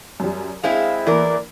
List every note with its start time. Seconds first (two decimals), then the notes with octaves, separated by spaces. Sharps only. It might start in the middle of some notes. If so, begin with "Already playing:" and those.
0.20 F#2 G3
0.64 G#3 C4 E4 G#4 F5 F7
1.07 E2 E3 A#3 A#4 D5